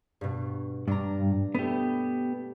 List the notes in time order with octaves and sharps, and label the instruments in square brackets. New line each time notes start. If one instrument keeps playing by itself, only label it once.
[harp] G2 B2
[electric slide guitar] G2 [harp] D4 A#5
[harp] A3 [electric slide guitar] B3 G4